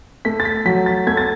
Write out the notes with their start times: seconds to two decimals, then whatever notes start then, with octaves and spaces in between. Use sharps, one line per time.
0.25 A3 B6
0.40 A6
0.45 B6
0.65 F#3 B6
0.86 A6
1.07 A3 G#6
1.17 A6